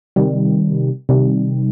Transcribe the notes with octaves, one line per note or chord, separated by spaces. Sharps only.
C3 D#3 G3
C3 D#3 G3